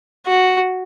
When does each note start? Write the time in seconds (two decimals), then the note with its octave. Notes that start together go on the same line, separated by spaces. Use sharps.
0.26 F#4